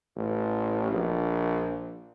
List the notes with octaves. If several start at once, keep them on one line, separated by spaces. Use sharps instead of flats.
A1
A#1